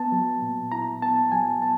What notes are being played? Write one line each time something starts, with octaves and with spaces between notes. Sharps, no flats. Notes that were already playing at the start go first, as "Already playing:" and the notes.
Already playing: B3 A5
F#3
A#2
E4 A#5
B3 A5
F#3 G#5
B3 A5